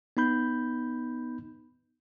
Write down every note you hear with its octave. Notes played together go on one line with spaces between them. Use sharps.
B3 D#4 B5 G6